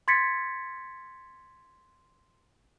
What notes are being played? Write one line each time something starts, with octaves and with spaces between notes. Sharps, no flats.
C6 G#6 A6 B6 C#7